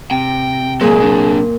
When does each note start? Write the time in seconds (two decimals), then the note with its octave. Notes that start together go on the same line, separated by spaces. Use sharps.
0.11 C3 G5
0.81 A#2 F#3 G#3 G#4
1.01 F#3 D4